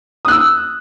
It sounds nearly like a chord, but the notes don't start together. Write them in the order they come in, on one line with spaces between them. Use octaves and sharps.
D#6 F#6 E6